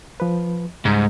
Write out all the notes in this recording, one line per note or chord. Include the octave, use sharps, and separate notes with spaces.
F3 B4
C#2 G#2 G3